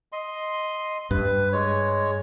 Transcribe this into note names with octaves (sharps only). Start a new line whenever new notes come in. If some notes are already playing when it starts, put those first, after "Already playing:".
D#5 C6
G2 B4
G#3 C#5